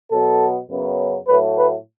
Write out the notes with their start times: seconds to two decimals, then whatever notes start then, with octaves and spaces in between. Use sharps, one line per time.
0.11 B2 F#3 B3 A4
0.70 F#2 C#3 F#3 B3
1.28 A2 F#3 A3 B4
1.58 B4